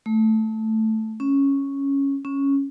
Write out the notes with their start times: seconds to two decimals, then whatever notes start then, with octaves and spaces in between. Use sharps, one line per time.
0.06 A3
1.20 C#4
2.25 C#4